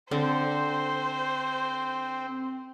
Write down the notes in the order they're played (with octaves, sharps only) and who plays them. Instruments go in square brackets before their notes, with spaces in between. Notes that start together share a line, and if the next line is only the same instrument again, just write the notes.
[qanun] D3 [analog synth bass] C4 [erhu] C5